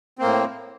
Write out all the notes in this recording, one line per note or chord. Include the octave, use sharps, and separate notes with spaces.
A2 A#3 C4